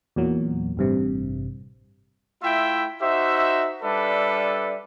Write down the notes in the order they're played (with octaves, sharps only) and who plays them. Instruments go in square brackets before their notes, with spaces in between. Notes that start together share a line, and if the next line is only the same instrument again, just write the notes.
[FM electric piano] E2 A#2 F#3
A1 G2 C3
[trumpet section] A3 E4 F4 E5 G5
D#4 F#4 C5 E5
G3 D4 A4 B4 E5